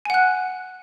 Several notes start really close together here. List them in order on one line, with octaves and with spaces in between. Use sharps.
G#5 F#5 F#6